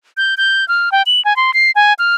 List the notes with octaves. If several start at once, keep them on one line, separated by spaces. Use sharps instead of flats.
G6
G6
F6
G5
F#7
G#5
C6
C7
G#5
F6